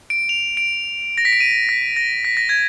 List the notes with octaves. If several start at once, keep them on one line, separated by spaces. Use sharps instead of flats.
D7
F7
D7
A#6
B6
D7
D#7
B6
A#6
B6
A#6
G#6